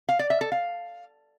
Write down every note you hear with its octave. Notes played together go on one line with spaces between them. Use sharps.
F5
D5
E5
A4
F5